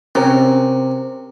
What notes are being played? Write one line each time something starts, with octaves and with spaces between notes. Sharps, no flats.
C3 C#4 A#4